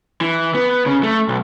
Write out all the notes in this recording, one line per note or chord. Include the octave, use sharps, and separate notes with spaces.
E3
B3
C#3
A3
B1